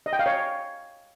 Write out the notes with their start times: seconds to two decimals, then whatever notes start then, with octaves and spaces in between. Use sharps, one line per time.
0.06 D#5
0.13 G5
0.19 F5
0.26 C#5